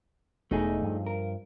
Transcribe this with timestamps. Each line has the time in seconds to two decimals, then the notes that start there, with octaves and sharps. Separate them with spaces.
0.51 E1 E2 A3 D#4 G#4
0.83 G2 F3
1.06 A#4